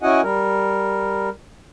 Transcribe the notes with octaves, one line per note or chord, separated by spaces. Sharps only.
C#4 E4 F#4 D#5 F#5 G#5
G3 A#4